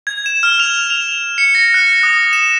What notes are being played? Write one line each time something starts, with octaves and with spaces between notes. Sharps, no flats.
G#6
E7
F6
F7
F7
C#7
A#6
F#6
D#6
E7